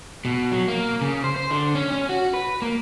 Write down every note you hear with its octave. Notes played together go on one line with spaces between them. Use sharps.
B2
F#3
A#3
C#3
C5
C5
D3
C#4
C#4
F#4
B4
A#3